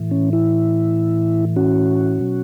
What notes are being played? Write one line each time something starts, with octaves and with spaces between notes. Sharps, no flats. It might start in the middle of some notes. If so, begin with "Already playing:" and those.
Already playing: A2 E3
C#4
E4
C#4 F#4
B2 F#3